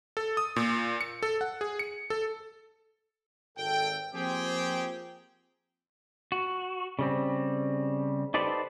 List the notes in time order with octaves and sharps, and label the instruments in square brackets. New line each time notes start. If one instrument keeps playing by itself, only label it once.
[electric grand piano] A4
D#6
A#2
C#7
A4
F#5
G#4
C#7
A4
[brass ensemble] G#1 A4 [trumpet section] G5
[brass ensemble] F3 A#3 C4 [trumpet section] G4 G#4 G5
[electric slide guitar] F#4
C#3 G3 C4
D#4 G4 A4 B4 C5 D5